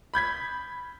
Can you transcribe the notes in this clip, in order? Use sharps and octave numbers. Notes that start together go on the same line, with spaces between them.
B5 G6 G#6 B6